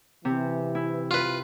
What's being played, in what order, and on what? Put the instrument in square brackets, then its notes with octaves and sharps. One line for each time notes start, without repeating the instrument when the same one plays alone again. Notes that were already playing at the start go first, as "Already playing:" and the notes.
[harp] C3 [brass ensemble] E3
[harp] E4
[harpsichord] F4 B4